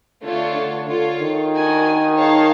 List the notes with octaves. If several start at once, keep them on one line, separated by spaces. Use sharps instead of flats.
D3 A3 D4 F4 A4 C#5
D3
D3 F4 A4 C#5
D#3
D4 F#4 A#4 D#5 G#5
D#4 G#4 C#5 F5 A5